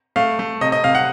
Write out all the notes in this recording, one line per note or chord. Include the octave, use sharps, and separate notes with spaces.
A3 F5
A3
C3 D#5
D#5
C3 F5
F#5